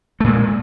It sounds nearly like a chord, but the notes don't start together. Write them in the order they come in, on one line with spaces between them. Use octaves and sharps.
A3 A#2 G#3